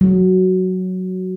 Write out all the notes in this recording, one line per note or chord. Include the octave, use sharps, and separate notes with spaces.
F#3